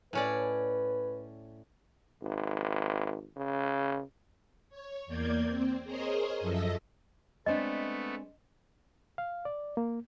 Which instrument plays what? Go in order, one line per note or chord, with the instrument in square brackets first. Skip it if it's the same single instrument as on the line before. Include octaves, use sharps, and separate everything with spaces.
[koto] A2 C#4 D5 [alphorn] B4
[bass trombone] G#1
C#3
[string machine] C#5
E2 A#3 D5 G6 G#6
C4
G#4 A#4 C5 C#5 D#5
F#2 F3 A4 D#5 E5 A#6
[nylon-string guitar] G#3 C4 D4 [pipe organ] A3 B3 A4 [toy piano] D#5
[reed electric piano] F5
D5
A#3